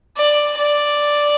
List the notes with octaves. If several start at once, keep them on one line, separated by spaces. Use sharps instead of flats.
D5
D5